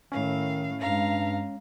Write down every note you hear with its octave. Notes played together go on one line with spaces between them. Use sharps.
A2 D#3 C#4 F5
G2 G#3 F5 A#5